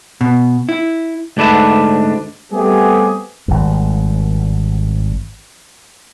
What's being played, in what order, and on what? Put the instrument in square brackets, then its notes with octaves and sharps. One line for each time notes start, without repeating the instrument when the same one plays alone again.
[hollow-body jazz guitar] B2
E4
[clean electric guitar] D2 G#2 D4 B4 E5
[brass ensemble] G3 A3 B3 C4 G4 G#4
[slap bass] G#1 G2